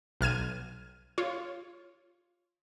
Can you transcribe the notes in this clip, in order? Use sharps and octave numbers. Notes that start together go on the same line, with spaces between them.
B1 F6 G#6 D#7
F4 C#5